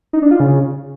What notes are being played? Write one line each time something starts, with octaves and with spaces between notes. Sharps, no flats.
D#4
D4
F4
C#3